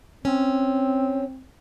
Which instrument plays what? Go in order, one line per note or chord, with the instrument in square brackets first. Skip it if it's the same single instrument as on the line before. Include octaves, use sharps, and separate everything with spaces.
[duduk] C4 [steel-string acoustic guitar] C#4